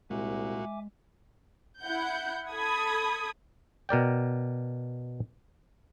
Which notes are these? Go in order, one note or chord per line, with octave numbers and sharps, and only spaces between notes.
C2 A#2 G#3 F#4 E5 G#5 D6
E4 F#5 G6
A4 B5 D#6 G#6
B2 A#4 D5 G5